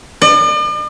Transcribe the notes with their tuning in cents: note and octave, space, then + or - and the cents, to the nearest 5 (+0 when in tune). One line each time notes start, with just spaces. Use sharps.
D5 +45